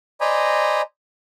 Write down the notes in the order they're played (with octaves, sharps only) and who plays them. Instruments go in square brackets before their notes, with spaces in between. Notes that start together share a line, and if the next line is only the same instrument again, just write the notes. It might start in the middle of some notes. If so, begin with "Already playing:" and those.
[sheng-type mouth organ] C5 D5 D#5 G#5 A#5 B5